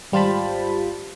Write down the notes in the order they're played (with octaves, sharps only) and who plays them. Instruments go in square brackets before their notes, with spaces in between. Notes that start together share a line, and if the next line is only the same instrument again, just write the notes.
[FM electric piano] G#1 G3 F4 C5 A5 B5